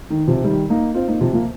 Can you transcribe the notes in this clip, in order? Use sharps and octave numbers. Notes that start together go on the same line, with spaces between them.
D#3
C3 F3
D#3 G3
A#3 D#4
C4 F4
A#3 D#4
C3 F3
F3 A#3